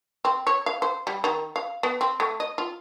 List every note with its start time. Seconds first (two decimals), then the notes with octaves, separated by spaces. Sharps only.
0.25 C4
0.47 C#5
0.66 F5
0.82 C5
1.07 G3
1.24 D#3
1.56 F5
1.83 B3
2.01 C4
2.20 A3
2.40 D#5
2.58 F4